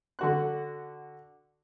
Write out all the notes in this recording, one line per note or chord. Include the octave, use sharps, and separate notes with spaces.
D3 F#4 F#6